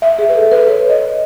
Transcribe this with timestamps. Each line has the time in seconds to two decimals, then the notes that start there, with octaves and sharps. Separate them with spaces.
0.02 E5
0.19 G#4
0.29 B4
0.35 A4
0.51 B4
0.68 C#5
0.89 D#5